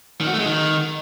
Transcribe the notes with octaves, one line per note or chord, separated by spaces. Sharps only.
D#3
F#4
A3
G#3
D#3